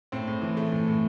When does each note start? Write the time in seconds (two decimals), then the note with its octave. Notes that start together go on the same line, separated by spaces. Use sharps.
0.12 A2 C4
0.28 A2
0.42 E3
0.57 A3
0.72 A2
0.88 A2